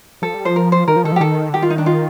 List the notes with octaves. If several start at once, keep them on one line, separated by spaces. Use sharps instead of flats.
F3 A4
G3
F3 C5
A#4
C5
D#3 A#4
F3
D#3 A4
F3
G4
D#3 A4
D3
D#3 G4
F4
D#4
D4
F4